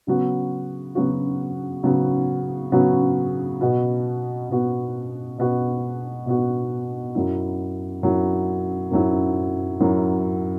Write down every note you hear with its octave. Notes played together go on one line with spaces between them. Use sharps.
C#3 F#3 B3 F#4
C#3 F#3 B3 F#4
C#3 F#3 B3 F#4
C#3 F#3 B3 F#4
B2 B3 F#4
B2 B3 F#4
B2 B3 F#4
B2 B3 F#4
F#2 F#3 E4
F#2 F#3 E4
F#2 F#3 E4
F#2 F#3 E4